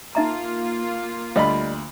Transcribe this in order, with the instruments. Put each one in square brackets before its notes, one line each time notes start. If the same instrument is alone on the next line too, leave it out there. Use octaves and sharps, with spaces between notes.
[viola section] A#3 F4 [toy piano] D#4 E5 A#5
[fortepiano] D2 B5 [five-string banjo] G3 D5 D#5